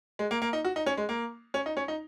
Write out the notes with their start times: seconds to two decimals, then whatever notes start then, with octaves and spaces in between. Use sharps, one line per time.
0.19 G#3
0.31 A#3
0.42 A#3
0.53 D#4
0.65 F#4
0.76 D#4
0.86 C#4
0.97 G#3
1.09 A#3
1.54 C#4
1.66 D#4
1.77 C#4
1.88 D#4